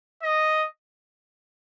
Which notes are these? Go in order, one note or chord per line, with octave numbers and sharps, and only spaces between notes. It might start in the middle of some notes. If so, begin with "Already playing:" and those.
D#5